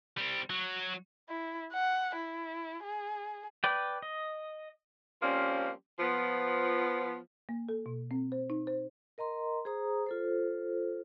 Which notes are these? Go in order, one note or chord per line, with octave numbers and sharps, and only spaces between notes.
G3 C4
F#3 F#4
E4
F#5
E4
G#4
B4 D5 G5
D#5
F3 G3 A#3 C4 C#4
F3 B3
A#3
A4
B2
C4
C5
D#4
C5
A#4 D#5 A#5 C6
G#4 C5 A#5 D#6
F4 A4 C5